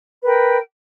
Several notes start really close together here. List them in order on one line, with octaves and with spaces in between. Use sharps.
B4 A#4 G5